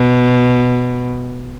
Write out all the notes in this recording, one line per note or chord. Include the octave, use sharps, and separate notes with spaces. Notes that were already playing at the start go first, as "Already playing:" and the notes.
Already playing: B2